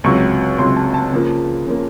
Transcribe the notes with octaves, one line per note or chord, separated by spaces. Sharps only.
C#2 C3 F#3 C#6
C#2 C3 F#3 C6
A5
A5
C#3 F3 A#3
C#3 F3 A#3